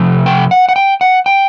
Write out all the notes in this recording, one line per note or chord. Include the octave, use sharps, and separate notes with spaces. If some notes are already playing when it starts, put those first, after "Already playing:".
Already playing: C3 F3 A3
G5
F#5
F#5
G5
F#5
G5